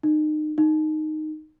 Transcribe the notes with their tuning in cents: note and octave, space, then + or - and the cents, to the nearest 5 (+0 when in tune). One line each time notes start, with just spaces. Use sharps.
D#4 -30
D#4 -5